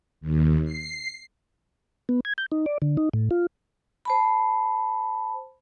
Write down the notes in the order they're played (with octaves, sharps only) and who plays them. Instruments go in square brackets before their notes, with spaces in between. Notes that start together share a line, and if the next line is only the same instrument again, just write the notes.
[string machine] D#2
C7
[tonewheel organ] B3
G#6
G6
D#4
D5
D3
D#4
A2
F4
[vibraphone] C5 A5 B5